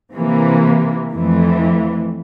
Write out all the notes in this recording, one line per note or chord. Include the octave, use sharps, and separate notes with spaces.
C3 E3 A#3
F2 E3 A3